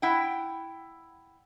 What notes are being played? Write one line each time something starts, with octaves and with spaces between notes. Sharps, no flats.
E4 F#5 G5